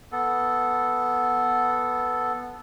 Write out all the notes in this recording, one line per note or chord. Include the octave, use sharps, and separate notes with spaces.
B3 A4